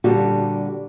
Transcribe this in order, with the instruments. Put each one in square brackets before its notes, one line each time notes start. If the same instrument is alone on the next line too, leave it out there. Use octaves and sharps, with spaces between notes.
[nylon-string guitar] A#2 D3 G3 F#4 G4 A4